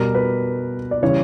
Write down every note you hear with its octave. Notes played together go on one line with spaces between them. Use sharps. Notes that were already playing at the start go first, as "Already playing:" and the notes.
Already playing: B2 G3 A#4
B4
D5
C#3 E3 G3 C#5